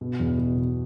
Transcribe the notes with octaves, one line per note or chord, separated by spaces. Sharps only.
B2
E2
B2
B2